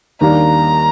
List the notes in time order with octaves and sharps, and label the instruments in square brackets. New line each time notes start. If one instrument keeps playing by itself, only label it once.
[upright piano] D#2 D#3 G3 A#3 D4 [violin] A#5